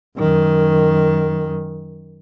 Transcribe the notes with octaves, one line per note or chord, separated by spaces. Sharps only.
F#2 D#3